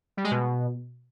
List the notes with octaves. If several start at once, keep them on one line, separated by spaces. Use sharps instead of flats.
G3
G#3
B2